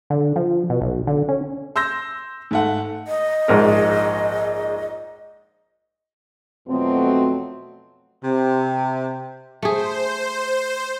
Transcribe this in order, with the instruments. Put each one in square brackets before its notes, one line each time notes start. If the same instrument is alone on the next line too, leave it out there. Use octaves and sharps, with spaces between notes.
[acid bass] D3
F3
B2
B1
D3
C#4
[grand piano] C6 E6 G6 A#6
G#2 A3 F#5
[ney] D#5
[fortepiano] A#1 G#2 A#4
[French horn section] F2 B2 F#3 A3 C4
[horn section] C3
[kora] A3 G#4 [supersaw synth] C5